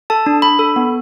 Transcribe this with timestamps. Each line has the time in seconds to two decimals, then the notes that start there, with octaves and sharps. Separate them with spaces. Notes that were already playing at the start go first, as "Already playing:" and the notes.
0.10 A4 A5
0.26 D4
0.42 D4 B5
0.59 A4
0.76 B3